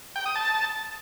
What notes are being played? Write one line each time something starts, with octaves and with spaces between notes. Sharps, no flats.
G5
D#6
A5